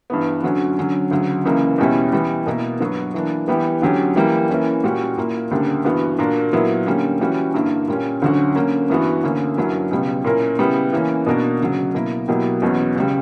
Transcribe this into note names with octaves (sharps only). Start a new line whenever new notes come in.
G2 E3 B3
D2 D3 F#3 C#4 F#4
D3 F#3 C#4
D2 C#3 F#3
C#2 C#3 E3 A#3
E2 B2 G3 C#4 E4
E3 G3 B3
B2 A#3 E4 A#4
G2 F#3 B3 F#4
E3 A#3 D4
E3 G3 B3 E4 G4
D2 D3 F#3 C#4 G4
E3 G3 A#3
E3 A#3 C#4 E4
A#2 G3 C#4 F#4
A#2 A#3 E4
D2 C#3 G3 A#3 D4
G2 E3 B3 F#4
A#2 A#3 D4 F#4 A#4
A#2 F#3 B3 E4
D3 G3 A#3 C#4
E3 G3 C#4 F#4
G2 D3 A#3 E4 A#4
A#2 G3 C#4
D2 D3 F#3 C#4 F#4
D3 A#3 C#4
G2 E3 B3 F#4
D2 D3 A#3 C#4
G2 F#3 C#4 E4 A#4
C#2 B2 G3 B3
A#2 A#3 C#4 E4 A#4
C#3 G3 B3 E4
E3 A#3 C#4
B2 A#3 D4 F#4 A#4
D2 C#3 F#3
B2 A#3 E4 A#4
B2 F#3 A#3 E4 G4
E2 B2 F#3 C#4
C#2 C#3 G3